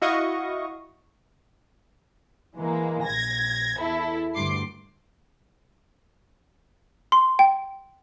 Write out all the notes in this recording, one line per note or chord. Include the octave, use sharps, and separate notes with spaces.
E4 F#4 D#5 F5 C#6 D#6
E3 G#3 A#3
A#1 G#6 A#6
E2 E4 A4
D2 G2 C6 D6 C7
C6
G5